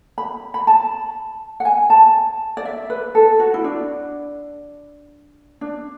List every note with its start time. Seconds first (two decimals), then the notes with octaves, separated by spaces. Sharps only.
0.18 B5
0.54 B5
0.67 A5
1.60 F#5
1.65 G#5
1.90 A5
2.57 D5
2.65 E5
2.90 B4
3.15 A4
3.40 F#4
3.54 E4
3.64 D4
5.61 D4